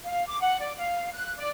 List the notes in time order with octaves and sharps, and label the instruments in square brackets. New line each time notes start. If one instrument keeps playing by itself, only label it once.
[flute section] F5
D6
F#5
D5
F5
F#6
D5